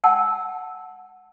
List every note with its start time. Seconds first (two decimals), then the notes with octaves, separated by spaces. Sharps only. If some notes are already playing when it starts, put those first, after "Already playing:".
0.04 F#5 G5 A5 E6